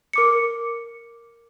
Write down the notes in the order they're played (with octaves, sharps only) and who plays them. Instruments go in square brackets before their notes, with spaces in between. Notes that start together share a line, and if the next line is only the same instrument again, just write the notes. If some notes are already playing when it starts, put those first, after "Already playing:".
[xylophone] A#4 D6 C#7